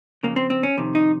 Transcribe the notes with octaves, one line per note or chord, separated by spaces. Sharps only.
F2 C#3 A#3
C4
C4
C#4
F2 C3 D#3
D#4